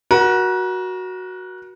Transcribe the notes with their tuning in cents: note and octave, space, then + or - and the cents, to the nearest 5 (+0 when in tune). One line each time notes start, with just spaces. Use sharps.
F#4 +0 A#4 +40